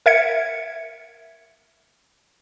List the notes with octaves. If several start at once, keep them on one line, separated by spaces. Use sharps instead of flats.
A#4 E5 G#6 C#7